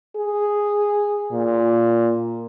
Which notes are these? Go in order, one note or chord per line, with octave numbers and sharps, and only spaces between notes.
G#4
A#2